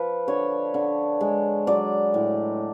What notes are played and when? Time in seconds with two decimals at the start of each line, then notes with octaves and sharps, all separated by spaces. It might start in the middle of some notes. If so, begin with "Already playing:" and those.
Already playing: F3 B4
0.28 D3 C#5
0.74 D3
1.21 G#3
1.67 F#3 D5
2.14 A2